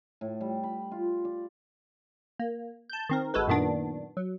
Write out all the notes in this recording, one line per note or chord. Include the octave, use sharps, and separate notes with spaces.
A2
G3
B5
F4
D5
A#3
A5 G6
D#3 C4 A#4
G#1 G#3 F#4 A4 B4
F#2 A#2 D#3 B3 D4
F#3